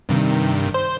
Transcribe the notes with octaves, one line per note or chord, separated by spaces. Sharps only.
G2 C3 D#3
C5